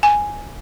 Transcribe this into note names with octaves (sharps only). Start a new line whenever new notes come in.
G#5